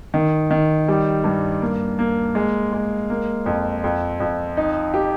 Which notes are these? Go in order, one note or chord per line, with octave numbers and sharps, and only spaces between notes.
D#3
D#3
G3
G2
A#3
A#3
G#3
G#3
A#3
F2
F2
F2
D#4
G4